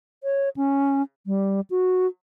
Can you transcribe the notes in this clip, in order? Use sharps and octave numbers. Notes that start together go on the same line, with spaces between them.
C#5
C#4
G3
F#4